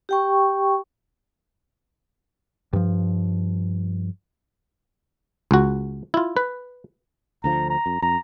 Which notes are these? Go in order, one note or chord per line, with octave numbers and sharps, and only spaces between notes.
G4 G5 C#6
G2 F3
C#2 F#4
E4 F4
B4
D2 D3 F3 A#5
A#5
F2
F2 A#5